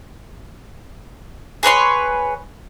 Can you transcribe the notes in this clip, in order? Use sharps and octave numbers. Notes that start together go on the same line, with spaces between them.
G#4 B4 C#5 C6